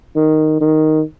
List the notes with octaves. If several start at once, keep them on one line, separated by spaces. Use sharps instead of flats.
D#3
D#3